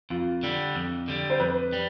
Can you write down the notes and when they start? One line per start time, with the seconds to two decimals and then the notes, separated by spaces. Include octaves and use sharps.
0.10 F2 F4
0.43 D3 G3
0.76 F2
1.08 D3 G3
1.30 C5
1.40 F2 B4
1.73 G3